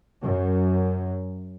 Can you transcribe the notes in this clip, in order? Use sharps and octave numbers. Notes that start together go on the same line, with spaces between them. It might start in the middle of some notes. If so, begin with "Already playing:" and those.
F#2